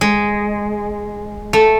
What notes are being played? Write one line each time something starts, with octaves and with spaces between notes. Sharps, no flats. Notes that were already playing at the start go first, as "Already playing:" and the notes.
G#3
A3